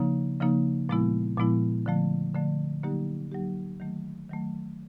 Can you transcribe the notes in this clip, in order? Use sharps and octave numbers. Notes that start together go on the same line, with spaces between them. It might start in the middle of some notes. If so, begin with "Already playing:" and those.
Already playing: C#3 F3 A#3 D#4
C#3 F3 A#3 D#4
A#2 F3 G#3 B3 E4
A#2 F3 G#3 B3 E4
D3 F3 A3
D3 F3 A3
D3 F#3 A#3 D#4 G4
D3 F#3 A#3 D#4 G4
D#3 F#3 A3
D#3 F#3 A3